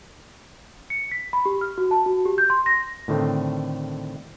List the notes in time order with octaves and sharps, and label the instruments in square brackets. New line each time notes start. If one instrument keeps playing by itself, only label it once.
[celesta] C#7
B6
B5
G4
F6
F#4
A5
F#4
G4
G6
C6
A#6
[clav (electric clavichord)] A2 D3 D#3 A3 C4